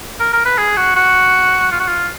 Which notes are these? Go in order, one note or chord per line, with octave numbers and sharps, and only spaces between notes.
A#4
A#4
B4
G#4
F#4
F#4
F4
F#4
F4